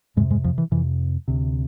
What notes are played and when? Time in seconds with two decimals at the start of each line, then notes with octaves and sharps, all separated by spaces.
0.16 F2 G#2 C3 G#3
0.30 G#2 G#3
0.44 F2 F3
0.58 E3
0.72 F2 C3 E3
1.28 D2 C3